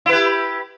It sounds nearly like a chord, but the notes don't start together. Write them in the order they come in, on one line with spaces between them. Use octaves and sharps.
E4 B4 G4